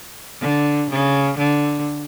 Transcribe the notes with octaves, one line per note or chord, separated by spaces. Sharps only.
D3
C#3
D3